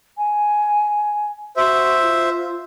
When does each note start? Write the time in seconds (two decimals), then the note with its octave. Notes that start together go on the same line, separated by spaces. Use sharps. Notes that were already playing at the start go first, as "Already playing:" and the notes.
0.18 G#5
1.57 F#4 C5 E5
2.02 F4